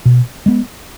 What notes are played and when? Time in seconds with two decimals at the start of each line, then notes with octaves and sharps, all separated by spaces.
0.05 B2
0.46 G#3 B3